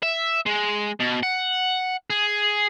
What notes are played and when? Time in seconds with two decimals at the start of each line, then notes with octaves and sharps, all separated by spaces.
0.03 E5
0.46 G#3
1.00 B2
1.23 F#5
2.10 G#4